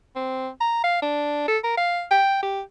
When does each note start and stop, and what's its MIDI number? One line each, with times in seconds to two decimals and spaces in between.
0.16 0.50 60
0.61 0.81 82
0.84 1.01 77
1.02 1.44 62
1.48 1.58 69
1.64 1.77 70
1.77 2.04 77
2.11 2.39 79
2.43 2.61 67